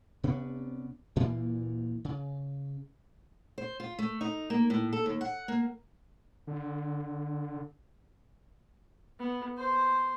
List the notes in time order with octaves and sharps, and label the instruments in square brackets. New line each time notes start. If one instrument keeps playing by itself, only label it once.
[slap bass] C3 B3 C#4 D4
D2 A#2 E3 A#3
C#3
[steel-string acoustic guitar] C5
F4
A3
D#4
A#3
A2
A4
D#2
F#5
A#3
[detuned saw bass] D3
[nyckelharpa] B3
C5